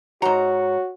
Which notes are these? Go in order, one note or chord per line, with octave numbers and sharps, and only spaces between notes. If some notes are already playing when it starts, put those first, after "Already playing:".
G#2 F#4 C#5 A#5